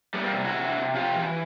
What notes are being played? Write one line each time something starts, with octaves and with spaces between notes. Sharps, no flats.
G3 A3 B3
A#3 C4
C3
E4 F#4
C3
C3
C3 F4 G4
E3